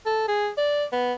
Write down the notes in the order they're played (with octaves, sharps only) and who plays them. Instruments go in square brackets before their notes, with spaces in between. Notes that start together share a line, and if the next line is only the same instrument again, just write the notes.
[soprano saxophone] A4
G#4
D5
B3